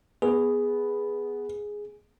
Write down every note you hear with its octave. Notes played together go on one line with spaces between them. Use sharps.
B3 G#4